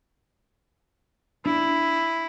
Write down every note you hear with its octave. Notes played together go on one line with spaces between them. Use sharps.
D4 E4